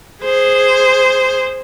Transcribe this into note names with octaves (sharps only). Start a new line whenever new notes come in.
G#4 C5